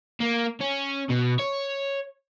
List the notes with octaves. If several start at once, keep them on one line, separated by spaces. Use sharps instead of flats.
A#3
C#4
B2
C#5